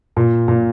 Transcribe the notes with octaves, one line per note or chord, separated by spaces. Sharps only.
A#2
A#2